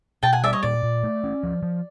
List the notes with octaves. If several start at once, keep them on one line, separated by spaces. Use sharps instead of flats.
B2 G5 A5
F#5 G#5
G3 D5 E5
C#5 D#5
A#2 D5
A#2
A3
C#4
F3
F3